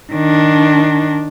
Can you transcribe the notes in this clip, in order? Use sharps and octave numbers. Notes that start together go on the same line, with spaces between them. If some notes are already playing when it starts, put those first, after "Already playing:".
D#3 D4